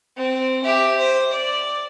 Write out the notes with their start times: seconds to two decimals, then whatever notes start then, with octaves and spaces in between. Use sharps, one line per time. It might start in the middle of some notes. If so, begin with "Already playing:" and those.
0.16 C4
0.64 G4 E5
0.97 C5
1.32 D5